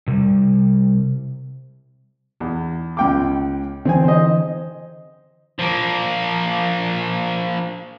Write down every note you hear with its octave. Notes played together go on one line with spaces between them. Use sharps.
C3 G3
E2
C#2 G5 D6
D3 E3 C4 G#5
C5 D#5
F3 A#3